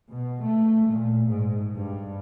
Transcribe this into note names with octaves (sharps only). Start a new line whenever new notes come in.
B2
A3
A#2
G#2
G2